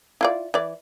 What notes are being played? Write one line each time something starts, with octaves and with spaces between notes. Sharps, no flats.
E4 F4 D5
E3 D5